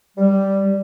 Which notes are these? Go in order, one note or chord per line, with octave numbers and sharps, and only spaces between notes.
G3